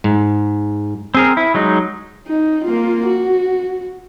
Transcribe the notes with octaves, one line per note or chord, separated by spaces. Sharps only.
G#2
C4 G#4 A#4
E4
F#3 G#3 D#4
D#4
A#3 F4
F#4